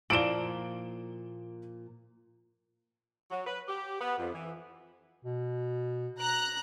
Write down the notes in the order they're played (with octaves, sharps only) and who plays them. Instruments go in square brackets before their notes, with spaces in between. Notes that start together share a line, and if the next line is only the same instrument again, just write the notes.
[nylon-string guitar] A#2 [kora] F3 A#3 [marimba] E4 D5 [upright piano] D7 E7 G7
[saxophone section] F#3
B4
G4
B3
F2
E3
[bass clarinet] B2
[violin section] A#5 F#6